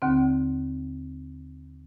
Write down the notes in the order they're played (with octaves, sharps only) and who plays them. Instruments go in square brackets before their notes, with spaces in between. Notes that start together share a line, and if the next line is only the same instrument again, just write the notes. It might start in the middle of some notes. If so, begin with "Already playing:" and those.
[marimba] D#2 D3 C4